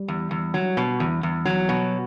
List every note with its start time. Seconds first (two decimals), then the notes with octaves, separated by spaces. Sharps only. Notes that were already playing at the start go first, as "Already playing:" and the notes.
Already playing: G3
0.08 E2
0.31 E2
0.54 F#3
0.77 B2
1.00 E2
1.23 E2
1.45 F#3
1.69 B2